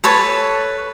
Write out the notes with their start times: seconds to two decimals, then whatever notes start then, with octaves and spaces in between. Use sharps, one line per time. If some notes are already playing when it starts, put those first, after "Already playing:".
0.04 A4 B4 C#5 A5